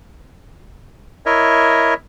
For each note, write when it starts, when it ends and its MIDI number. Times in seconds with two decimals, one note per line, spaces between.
1.26 1.94 64
1.26 1.94 70
1.26 1.94 73
1.26 1.94 75
1.26 1.94 76